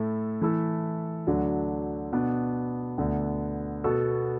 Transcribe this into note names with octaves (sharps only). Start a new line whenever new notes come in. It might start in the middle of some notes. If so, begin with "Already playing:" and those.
Already playing: A2 A3 E4 A4
E3 A3 E4 A4
D2 D3 F#3 D4
B2 B3 D4
D2 D3 B3
B2 B3 F#4 A4